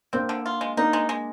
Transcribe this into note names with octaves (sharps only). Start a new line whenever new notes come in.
A#3 C4 D4
D3
F4
G#3
A#3 D4 D#4
G#3
G#3